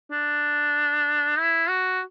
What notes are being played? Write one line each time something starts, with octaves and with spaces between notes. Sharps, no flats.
D4
E4
F#4